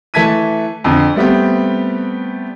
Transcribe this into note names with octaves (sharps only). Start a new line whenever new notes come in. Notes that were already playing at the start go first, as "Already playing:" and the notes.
E3 A3 A5 G#6 B6 D#7
F2 D3
G3 A3 B3 C4 G4